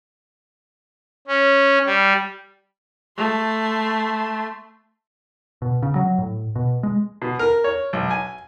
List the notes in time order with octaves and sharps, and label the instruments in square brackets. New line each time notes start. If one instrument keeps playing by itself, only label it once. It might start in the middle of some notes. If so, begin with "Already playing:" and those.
[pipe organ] C#4
G3
[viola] A3 C6
[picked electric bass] B2
C#3
F#3
A2
B2
G#3
[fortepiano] B2
A#4
C#5
B1
G#5